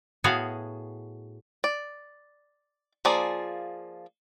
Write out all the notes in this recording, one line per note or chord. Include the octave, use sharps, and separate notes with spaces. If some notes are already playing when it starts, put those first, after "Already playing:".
A2 B3 F#4 G#4 F5 G#5
D5
F3 A#3 G#4 D5